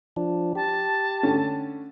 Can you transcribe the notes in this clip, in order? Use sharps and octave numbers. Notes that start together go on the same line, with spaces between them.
F3 D4
G4 A5
D3 A3 C#4